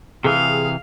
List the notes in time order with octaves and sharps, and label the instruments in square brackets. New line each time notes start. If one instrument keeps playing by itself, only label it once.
[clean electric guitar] C3 E3 [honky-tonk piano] G#4 D#6 [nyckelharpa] F5